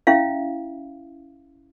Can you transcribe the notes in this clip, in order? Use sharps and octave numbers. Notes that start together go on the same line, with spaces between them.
C#4 E4 E5 F5